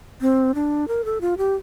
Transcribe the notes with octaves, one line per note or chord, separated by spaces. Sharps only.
C4
D4
A#4
A4
F4
G4